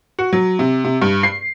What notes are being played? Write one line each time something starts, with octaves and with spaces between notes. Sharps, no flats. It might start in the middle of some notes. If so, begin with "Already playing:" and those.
F#4
F#3
C3
C3
G2
C7